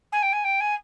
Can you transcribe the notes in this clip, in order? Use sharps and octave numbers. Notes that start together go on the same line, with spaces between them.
G#5
G5
G#5
G5
G#5